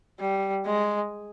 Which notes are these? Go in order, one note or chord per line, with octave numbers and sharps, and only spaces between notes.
G3
G#3